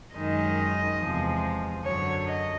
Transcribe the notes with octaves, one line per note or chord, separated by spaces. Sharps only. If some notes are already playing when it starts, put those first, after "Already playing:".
F#2 D#3 G#3 D#5
E2 C3 F3 G#3
F#2 D3 F#3 C#5
D#5